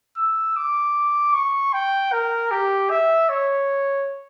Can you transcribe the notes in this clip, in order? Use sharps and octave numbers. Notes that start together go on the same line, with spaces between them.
E6
D6
C#6
G5
A#4
G4
E5
C#5